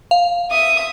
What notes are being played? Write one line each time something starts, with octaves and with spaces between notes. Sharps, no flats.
F5
E5 D#6